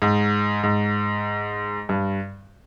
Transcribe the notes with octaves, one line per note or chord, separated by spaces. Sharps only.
G#2
G#2
G2